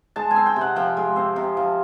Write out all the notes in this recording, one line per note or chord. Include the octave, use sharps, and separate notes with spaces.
G#3 A5
G#5
C4
G5
C3
F#5
F3 G5
G#3
C4
C3
F3